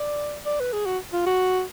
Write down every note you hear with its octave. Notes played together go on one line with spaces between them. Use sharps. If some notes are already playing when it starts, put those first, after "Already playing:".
Already playing: D5
D5
B4
G#4
F#4
F4
F#4